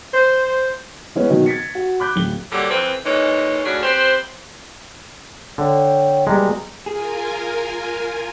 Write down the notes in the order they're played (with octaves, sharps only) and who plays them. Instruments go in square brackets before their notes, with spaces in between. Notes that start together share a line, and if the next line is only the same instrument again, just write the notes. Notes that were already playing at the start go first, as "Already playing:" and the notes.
[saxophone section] C5
[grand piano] E3 G#3 B3 C#4 B4
B2 D#3 F#3 D#4
G#6 A6 B6 C#7
F#4
B5 D6 F#6 G6
D1 G7
[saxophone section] A#2 D3 F#3 G3
F2 E3 F3 C4 B4 C5
A#2 E3 G#3 C#4 D#4
A2 C#3 C#4 D4 F#4
C4 G4 B4 C5
[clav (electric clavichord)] D3 [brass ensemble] C#5 G5
[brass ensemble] F#1 B2 A#5 [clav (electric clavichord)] G3 G#3
[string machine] F4 A#4 G#5 [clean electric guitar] G#4